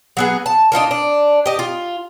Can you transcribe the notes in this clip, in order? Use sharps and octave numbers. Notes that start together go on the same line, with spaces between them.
F#3 B3 G#4
A5
D4 D#4 F4 A#4
D4
G4 D#5
F4